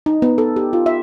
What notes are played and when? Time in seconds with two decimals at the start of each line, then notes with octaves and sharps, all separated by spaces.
0.06 D#4
0.22 B3
0.38 A4
0.56 G4
0.73 F4
0.86 E5